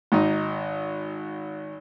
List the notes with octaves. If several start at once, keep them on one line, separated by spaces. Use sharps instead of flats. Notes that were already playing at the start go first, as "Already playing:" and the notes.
G#1 D#4